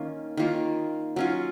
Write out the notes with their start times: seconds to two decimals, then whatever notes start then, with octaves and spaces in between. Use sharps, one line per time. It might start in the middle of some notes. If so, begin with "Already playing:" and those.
Already playing: D#3 A#3 C#4 F4
0.37 D#3 A#3 F4
1.16 F#3 C#4 F4